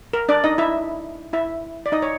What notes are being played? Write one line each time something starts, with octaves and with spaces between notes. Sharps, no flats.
A#4
D4 D5
D#4 D#5
E4 E5
E4 E5
D5
D#4 D#5
C#5